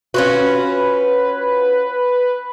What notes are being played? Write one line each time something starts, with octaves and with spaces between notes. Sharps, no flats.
C#4 F4 F#4 B4